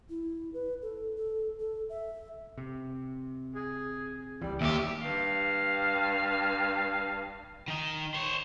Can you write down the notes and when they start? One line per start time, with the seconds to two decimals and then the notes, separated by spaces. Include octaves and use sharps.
0.09 E4
0.54 B4
0.82 A4
1.16 A4
1.60 A4
1.89 E5
2.58 C3
3.55 G#4
4.42 C#2 E3 G3
4.61 D#2 G4 E5
5.00 G2 F5
7.68 D#3 D#4
8.14 C5 C#5